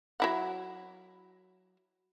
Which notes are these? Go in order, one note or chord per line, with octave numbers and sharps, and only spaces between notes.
F#3 E4 F#5